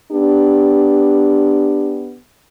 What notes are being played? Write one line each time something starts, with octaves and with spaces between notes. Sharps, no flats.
B3 D4 G4